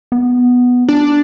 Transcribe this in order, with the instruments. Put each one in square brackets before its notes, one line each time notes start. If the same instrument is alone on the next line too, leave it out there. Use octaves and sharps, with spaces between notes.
[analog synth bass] B3
[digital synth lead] D4